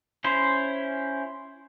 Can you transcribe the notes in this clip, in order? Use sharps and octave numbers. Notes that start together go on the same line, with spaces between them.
C#4 E4 C5